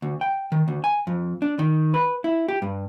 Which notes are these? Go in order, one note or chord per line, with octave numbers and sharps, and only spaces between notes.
D2
G5
D#3
D2
G#5
F2
D4
D#3
B4
E4
G4
G2